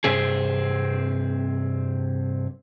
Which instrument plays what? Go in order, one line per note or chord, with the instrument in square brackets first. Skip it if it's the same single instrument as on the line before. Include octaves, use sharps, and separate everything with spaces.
[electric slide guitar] G2 C3 C4 G#4